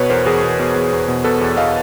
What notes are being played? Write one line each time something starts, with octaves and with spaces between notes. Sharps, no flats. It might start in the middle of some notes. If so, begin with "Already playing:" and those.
Already playing: B2 B4 C#5
E2 A#4 C5
E2 G#4 A#4
B2
B2
E2
E2
B2
B2 A4 B4
E2
E2 D#5 F5